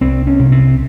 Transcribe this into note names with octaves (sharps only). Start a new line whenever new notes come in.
C2 C4
C#4
C3
C4